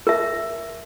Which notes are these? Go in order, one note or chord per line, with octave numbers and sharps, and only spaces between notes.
A#4 E5